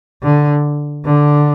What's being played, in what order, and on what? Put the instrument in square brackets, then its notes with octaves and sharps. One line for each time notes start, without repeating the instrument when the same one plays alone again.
[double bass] D3
D3